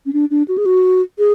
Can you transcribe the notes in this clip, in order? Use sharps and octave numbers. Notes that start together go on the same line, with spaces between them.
C#4
D4
D4
F#4
G#4
F#4
G#4